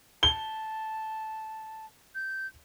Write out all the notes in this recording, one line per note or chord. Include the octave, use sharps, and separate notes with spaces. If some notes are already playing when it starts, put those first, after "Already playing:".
A5 G7
G6